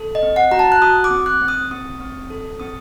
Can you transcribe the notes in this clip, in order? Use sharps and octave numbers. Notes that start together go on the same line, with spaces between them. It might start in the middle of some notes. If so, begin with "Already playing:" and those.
Already playing: A4
D#5
C4
F#5
F#4 A#5
A5
F#6
F#4 D#6
D6
C4
F#6
C4
D#6
C4 D#6
C4
A4
C4 D#6